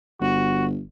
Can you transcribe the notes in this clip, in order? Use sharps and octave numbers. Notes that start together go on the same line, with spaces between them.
G1 F#4